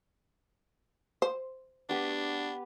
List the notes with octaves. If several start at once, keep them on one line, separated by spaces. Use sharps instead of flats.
C5
B3 D4 G4 B4